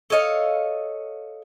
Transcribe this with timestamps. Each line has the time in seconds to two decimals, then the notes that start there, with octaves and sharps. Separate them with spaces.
0.10 A4 C#5 D#5 F5